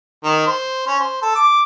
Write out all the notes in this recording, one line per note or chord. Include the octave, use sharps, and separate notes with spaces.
D#3
C5
C#4
C5
A4
D6